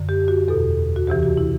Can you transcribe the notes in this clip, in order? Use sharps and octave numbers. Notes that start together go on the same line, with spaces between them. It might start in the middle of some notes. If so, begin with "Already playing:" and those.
Already playing: F#2 D3
G4
F#4
E2 B2 A4
F#4
D2 C3 E3 G4
F#4
E4